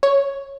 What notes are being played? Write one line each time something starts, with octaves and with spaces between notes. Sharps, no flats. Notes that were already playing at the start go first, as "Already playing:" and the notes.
C#5